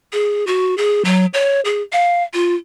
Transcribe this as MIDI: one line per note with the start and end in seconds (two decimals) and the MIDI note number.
0.13 0.45 68
0.47 0.77 66
0.78 1.03 68
1.05 1.26 54
1.34 1.61 73
1.65 1.82 68
1.93 2.24 77
2.34 2.55 65